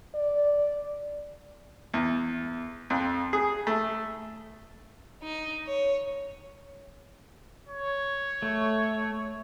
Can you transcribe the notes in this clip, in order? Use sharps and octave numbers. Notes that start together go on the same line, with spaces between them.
D5
E2
F2
G#4
A3
D#4
C#5
C#5
A3